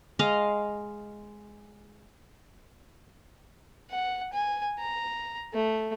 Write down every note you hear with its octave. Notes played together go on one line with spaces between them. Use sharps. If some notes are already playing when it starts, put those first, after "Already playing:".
G#3 D#5 F5
F#5
G#5
A#5
A3